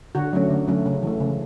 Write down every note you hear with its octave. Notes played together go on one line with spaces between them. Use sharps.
D3 F#4
F#3 A3 C#4
D3
F#3 A3 C#4
C#3
E3 A3
C#3